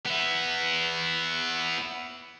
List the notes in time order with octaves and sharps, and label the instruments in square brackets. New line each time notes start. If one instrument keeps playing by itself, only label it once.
[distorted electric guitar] B3 E4